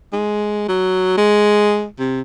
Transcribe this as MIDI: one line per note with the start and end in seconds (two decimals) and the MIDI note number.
0.13 0.66 56
0.68 1.15 54
1.18 1.87 56
1.99 2.21 48